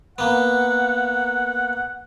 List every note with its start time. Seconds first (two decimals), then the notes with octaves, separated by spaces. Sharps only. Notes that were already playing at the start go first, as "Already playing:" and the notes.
0.18 A#3 B3 F#5